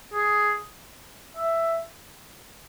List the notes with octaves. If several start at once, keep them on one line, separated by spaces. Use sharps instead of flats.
G#4
E5